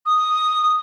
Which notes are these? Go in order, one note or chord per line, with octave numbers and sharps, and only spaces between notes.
D#6